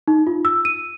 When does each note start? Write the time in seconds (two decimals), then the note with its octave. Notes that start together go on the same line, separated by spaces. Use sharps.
0.08 D#4
0.27 F4
0.45 E6
0.65 D#7